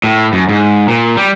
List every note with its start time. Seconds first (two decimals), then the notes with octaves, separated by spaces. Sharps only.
0.04 A2
0.33 F#2
0.49 G#2
0.88 A#2
1.17 G3